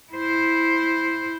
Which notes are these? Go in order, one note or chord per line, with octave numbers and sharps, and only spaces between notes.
E4 C5